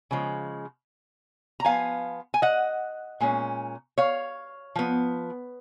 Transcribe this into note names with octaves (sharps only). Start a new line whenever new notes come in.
C#3 F3 G#3
A#5
F3 B3 F5 G#5
G#5
D#5 F#5
A#2 G#3 C#4
C#5 F5
F3 B3